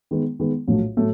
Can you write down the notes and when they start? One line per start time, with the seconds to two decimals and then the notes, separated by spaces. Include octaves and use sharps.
0.11 D#3 G#3 B3
0.39 D#3 G#3 B3
0.67 A#1 A2 F#3 A3
0.97 A2 F#3 A3